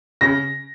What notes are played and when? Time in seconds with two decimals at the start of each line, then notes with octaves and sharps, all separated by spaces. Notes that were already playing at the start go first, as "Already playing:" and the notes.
0.21 C#3 A#6